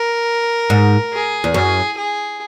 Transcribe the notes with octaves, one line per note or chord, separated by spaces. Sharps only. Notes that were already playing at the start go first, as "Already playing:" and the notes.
Already playing: A#4
G#2
G#4
E2
F#2 G#4
G#4